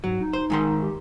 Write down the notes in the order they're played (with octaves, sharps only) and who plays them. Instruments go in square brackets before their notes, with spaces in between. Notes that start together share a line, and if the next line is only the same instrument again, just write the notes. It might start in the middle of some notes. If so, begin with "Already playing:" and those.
[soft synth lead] G#2 [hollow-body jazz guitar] F#3
[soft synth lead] D#4
[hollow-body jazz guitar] C5
G#2 D#3 C6
[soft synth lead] G4